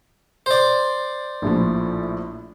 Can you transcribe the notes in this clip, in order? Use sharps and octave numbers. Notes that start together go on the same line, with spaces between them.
C5 D5
A#1 A2 F3